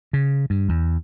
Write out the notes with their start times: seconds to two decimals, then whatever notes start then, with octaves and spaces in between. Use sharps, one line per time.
0.13 C#3
0.50 G2
0.69 E2